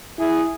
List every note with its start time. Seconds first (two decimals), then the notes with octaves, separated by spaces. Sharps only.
0.19 E4 G#4